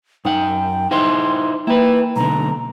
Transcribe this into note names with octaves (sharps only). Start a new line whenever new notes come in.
F#2 D#4 F#5 G5
D#4 E4 C5 G5 C6
A#3 E4 B4 G5
B1 D3 A#5